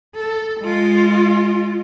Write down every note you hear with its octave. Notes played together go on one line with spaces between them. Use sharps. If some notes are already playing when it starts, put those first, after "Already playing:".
A4
G#3 F4